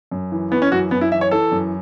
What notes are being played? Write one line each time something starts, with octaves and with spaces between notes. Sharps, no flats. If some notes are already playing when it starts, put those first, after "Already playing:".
F#2
E3
E3 B3
C#4
F#2 F#4
F#2 B3
E4
E3 E5
C#5
E3 A4
F#2